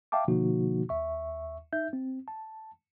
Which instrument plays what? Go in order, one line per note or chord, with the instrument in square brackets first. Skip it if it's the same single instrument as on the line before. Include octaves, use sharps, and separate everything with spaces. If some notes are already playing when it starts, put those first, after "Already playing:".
[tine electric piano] E5 F5 G5 A5 D6
B2 D3 F3 A#3 D#4 F#4
D#2 E5 C#6
D#4 E5 G6
C4
A5